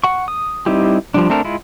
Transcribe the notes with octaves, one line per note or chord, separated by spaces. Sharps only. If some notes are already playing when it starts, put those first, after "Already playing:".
F#5 C#6
D#6
G3 C4 D#4 E4 G4
F3 G3 D4
A3 C4 D4 A4 A#4
G#3 E4 F4